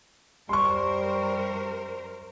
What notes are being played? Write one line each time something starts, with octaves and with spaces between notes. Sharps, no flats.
F#2 G3 A#4 C5 C6 C#6